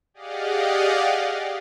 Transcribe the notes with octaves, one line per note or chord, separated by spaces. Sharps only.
G4 G#4 D5 D#5 F5 F#5